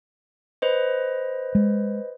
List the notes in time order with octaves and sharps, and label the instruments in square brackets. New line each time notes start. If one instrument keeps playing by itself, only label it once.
[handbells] B4 C5 D#5
[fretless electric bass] G#3